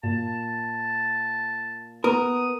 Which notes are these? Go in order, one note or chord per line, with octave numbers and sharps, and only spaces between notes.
A#2 A5
B3 A#4 D#6